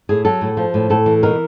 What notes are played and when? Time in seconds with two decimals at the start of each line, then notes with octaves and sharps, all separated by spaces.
0.09 A2 G#4
0.25 F#3 A4
0.41 A2
0.57 F3
0.74 A2
0.90 A2 A4
1.06 E3
1.23 B2 A#4